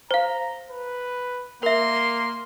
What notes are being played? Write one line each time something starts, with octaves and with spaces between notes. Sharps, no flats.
C5 F5 A#5
B4
A#3 A#4 E5 C6